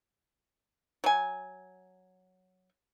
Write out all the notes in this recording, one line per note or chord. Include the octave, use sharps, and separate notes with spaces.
F#3 G#5